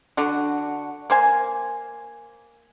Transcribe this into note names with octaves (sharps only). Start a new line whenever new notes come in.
D3 D4 F#4
A#3 C5 G#5